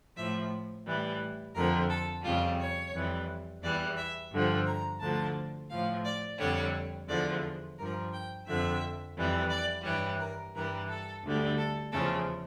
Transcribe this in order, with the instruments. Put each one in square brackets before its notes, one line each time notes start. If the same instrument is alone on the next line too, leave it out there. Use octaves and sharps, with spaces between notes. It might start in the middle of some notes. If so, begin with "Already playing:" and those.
[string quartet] A2 F3 E5
A2 E3 G3
F2 D3 F3 A#4
A4
F2 C#3 G3 F4
C#5
F2 E3 G3
E2 E3 G3 D5
E5
G2 D3 F3
A#5
D2 D3 F3 A5
A2 F3 F5
D5
F2 D3 G3 C#5
E2 D3 F3 D5
G2 F3 A#4
G5
F2 D3 F3 E5
F2 E3 G3
D5
G2 E3 G3 C#5
A#4
G2 E3 G3 A#4
A4
D2 D3 G3
A4
E2 C#3 F3 A4